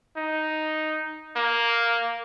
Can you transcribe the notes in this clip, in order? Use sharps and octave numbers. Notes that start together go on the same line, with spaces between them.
D#4
A#3